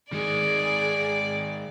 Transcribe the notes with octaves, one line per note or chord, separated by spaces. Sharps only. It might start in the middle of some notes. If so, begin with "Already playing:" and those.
D#3 G#3 G#4 D5